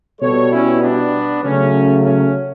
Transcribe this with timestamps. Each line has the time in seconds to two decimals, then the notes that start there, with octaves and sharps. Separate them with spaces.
0.21 B2 G3 A4 C#5
0.51 C#4 E4
0.81 B3 D4
1.43 C#3 F#3 A3 C#4
2.04 C#4